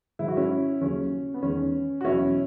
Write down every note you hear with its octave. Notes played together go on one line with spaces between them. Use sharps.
G#2 D#3 F#3 E4
F#4
C#4 E4
D#2 C#3 F#3 C#4
B3
E2 D#3 G#3 C#4
F#4
E2 B2 F#3 C#4 E4